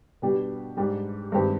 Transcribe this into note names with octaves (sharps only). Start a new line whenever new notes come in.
B2 G3 D4 G4
G#2 G3 D4 G4
G2 D#3 G#3 C4 G4